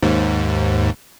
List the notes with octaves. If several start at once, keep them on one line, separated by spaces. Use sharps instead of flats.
D#2 G#2